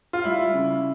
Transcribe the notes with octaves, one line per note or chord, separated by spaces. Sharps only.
F4
G3 E4
C#3